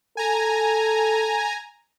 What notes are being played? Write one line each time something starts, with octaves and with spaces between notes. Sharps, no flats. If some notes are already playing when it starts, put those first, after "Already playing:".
A4 G#5 A#5